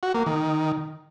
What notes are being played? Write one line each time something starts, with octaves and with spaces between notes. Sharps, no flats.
F#4
A#3
D#3